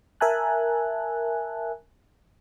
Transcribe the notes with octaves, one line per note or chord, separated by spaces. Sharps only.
A#4 E5 G#5 A5 F#6